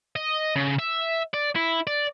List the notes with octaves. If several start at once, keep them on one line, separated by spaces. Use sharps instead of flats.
D#5
C#3
E5
D5
E4
D5